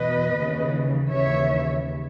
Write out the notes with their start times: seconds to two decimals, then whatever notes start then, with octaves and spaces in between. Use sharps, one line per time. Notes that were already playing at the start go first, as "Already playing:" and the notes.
Already playing: E2 B2 B4 D#5
0.35 D#2 C#3 E3
1.10 D#2 C#3 E3 C#5 E5